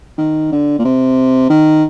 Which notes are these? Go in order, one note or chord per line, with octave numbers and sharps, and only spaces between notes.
D#3
D3
A#2
C3
D#3